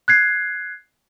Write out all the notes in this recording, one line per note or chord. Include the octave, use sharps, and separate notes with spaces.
F#6 G#6 C7